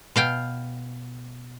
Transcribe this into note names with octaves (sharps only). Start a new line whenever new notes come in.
B2 F5 G5